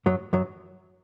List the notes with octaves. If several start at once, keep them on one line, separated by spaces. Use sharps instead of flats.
F#2 F#3
F#2 F#3